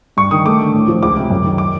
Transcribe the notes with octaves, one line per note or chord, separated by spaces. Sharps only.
G2 C#6
D#3 D#6
A3 D6
D3
A2
F3
C#2 D6
C3
F#2
D#3
D6